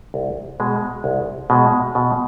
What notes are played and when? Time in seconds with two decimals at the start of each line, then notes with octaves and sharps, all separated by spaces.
0.14 C2
0.60 B2 G#3
1.04 C2
1.50 B2 G#3
1.95 B2